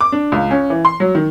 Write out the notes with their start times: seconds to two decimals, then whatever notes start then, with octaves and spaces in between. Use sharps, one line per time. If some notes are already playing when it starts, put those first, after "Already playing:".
0.01 D6
0.12 D4
0.32 C#2
0.51 C#4
0.70 E3
0.85 C6
1.00 F#3
1.15 D#3